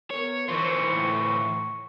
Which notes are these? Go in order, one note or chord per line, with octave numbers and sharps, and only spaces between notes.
B3 A#4 C#5
E3 D#4 F4 A#4 C5 C#6
A2